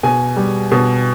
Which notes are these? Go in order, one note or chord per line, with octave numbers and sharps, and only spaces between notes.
B2 G#5
G3
B2